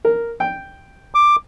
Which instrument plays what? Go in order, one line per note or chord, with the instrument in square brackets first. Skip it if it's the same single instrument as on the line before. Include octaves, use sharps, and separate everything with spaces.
[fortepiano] A#4
G5
[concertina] D6